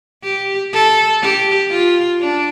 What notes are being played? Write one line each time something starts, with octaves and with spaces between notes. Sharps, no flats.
G4
A4
G4
F4
D4